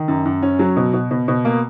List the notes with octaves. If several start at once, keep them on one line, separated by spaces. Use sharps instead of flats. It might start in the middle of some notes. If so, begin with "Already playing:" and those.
Already playing: D#3
F#2
F#2
C#4
F#3
B2
B2
B2
B2
A#3